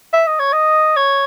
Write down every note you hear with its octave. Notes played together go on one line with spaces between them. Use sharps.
E5
D#5
C#5
D#5
C#5